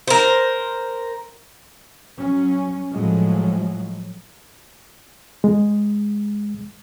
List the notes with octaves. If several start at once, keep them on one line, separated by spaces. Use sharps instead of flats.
A#4 C5
F#3 C#4
A2 F3 F#3 G#3
G#3